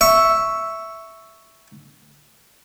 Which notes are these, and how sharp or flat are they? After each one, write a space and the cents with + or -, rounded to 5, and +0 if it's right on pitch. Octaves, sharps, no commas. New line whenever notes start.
E5 +0 C#6 +5